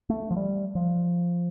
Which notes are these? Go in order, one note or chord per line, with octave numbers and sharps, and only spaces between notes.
A3
F3
G3
F3